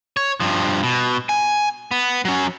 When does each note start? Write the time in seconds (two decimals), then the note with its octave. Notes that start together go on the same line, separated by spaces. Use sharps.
0.17 C#5
0.40 G2 F3
0.83 B2
1.29 G#5
1.91 B3
2.25 F#3 C#4